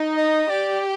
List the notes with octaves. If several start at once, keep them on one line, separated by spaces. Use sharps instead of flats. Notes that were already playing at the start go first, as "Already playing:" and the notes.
Already playing: D#4
D#5
G4 D5